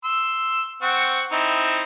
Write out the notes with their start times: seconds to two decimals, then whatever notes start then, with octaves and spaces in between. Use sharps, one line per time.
0.05 C6 E6
0.82 C4 F#5 C#6
1.32 C4 D#4 E4